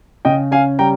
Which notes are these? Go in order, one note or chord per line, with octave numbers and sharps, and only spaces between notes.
C#3 D#5 G5
C#4 F5 G#5
G3 G5 A#5